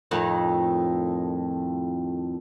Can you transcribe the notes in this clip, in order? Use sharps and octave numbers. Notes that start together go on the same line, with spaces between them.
F2 A2 D#3